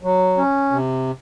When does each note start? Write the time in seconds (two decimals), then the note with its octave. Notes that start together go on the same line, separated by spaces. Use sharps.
0.03 F#3
0.37 C#4
0.71 C3